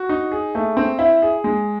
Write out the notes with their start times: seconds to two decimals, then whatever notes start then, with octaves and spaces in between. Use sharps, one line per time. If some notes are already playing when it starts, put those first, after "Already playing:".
Already playing: F#4
0.09 D#4
0.32 G#4
0.55 A3
0.77 C4
0.99 E4
1.22 G#4
1.44 G#3